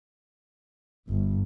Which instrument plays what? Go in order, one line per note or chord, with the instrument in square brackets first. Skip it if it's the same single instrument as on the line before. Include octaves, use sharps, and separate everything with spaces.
[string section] G1